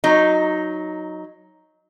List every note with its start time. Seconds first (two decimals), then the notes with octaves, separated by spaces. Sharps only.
0.04 F#3 D#4